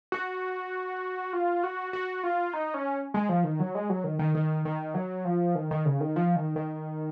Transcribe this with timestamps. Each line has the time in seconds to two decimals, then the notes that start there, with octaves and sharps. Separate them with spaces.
0.12 F#4
1.33 F4
1.64 F#4
1.93 F#4
2.23 F4
2.53 D#4
2.74 C#4
3.14 G#3
3.29 F3
3.44 D#3
3.60 F#3
3.75 G#3
3.90 F#3
4.04 D#3
4.19 D#3
4.35 D#3
4.65 D#3
4.94 F#3
5.25 F3
5.55 D#3
5.71 D#3
5.85 C#3
6.01 D#3
6.16 F3
6.36 D#3
6.56 D#3